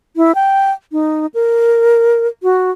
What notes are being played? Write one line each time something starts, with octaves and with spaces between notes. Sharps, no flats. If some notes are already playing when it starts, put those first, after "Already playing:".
E4
G5
D#4
A#4
F#4